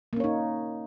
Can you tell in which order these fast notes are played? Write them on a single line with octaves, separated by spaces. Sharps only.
A#3 C#4 C#5 D#4